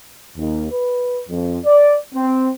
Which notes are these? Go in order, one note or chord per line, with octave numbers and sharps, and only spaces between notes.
D#2
B4
F2
D5
C4